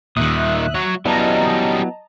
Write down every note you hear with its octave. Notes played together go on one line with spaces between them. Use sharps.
D#2 A#2 D#3 E5 D#6 F#6
F#3 C#5
F#3 G3 B3 C#4 E4 D#5 A5 A#5